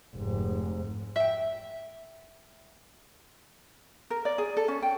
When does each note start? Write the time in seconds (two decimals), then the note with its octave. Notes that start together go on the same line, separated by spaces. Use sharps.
0.16 F1 G#2
1.16 E5 G5
4.10 A#4
4.25 D5
4.38 G#4
4.57 A4
4.68 C#4
4.82 G5